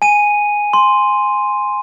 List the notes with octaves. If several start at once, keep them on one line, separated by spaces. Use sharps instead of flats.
G#5 D#7
C6